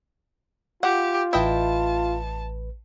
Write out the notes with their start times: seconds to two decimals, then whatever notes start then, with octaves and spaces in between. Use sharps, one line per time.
0.83 F4 G4 F#5
1.33 A1 E4 B4 D#5 G5 A5